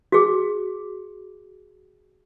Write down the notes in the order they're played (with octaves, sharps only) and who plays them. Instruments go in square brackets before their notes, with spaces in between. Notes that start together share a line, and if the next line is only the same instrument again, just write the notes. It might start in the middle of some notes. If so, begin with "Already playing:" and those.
[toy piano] F#4 G#4